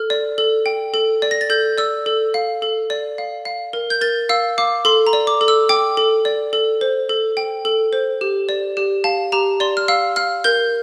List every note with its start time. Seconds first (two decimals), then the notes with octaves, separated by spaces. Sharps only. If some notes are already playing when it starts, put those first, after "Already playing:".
Already playing: A4 F6
0.10 D5
0.38 A4
0.66 G5
0.94 A4
1.22 D5
1.31 A#6
1.41 A6
1.50 A4 G6
1.78 D5 E6
2.06 A4
2.34 F5
2.62 A4
2.90 D5
3.18 F5
3.45 F5
3.73 A#4
3.90 G6
4.01 A#4 A6
4.29 F5 E6
4.58 F5 D6
4.85 A4 C6
5.07 A#5
5.13 D5
5.27 D6
5.41 A4
5.48 E6
5.69 G5 D6
5.97 A4
6.25 D5
6.53 A4
6.81 C5
7.09 A4
7.37 G5
7.65 A4
7.93 C5
8.21 G4
8.49 D5
8.77 G4
9.04 F5 A5
9.32 G4 A#5
9.60 D5 C6
9.77 F6
9.88 F5 E6
10.16 F5 F6
10.44 A#4 G6